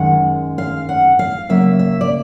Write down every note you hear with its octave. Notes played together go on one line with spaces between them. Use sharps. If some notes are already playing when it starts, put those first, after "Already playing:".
Already playing: F#2 D#3 G#3 F#5
F5
F#5
F5
C#3 F#3 A#3 E5
E5
D5